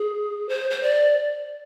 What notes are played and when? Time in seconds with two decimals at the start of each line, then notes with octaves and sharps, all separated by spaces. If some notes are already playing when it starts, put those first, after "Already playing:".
Already playing: G#4
0.49 C5
0.70 C5
0.83 D5